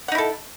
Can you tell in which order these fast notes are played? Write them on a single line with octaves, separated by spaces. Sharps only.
F#5 D#4 E4 A4